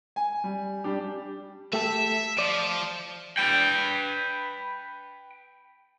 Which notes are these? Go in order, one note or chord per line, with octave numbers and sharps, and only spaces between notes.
G#5
G3
G3 D4 G4
A3 G4 A4 E5
F3 D5
B4 G5